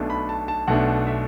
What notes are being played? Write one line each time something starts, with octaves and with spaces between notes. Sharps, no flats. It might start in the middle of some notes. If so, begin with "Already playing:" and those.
Already playing: B1 B2 A3 D4
B5
A5
A5
B1 B2 A3 D4 F#5
E5